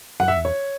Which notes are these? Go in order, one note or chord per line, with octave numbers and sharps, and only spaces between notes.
F#2 F#5
E5
E2
C#5